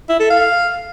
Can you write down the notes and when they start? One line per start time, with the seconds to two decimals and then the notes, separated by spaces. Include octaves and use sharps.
0.09 E4
0.20 A4
0.30 F5